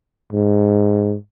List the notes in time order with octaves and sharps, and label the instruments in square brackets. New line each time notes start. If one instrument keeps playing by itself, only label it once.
[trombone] G#2